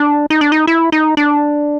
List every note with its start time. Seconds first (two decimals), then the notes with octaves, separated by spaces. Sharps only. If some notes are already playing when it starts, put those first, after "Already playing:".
Already playing: D4
0.30 D#4
0.41 D4
0.52 D#4
0.67 E4
0.92 D#4
1.17 D4